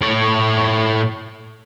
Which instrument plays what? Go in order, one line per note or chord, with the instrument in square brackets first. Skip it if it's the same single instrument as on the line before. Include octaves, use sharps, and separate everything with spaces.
[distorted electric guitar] A2 C#5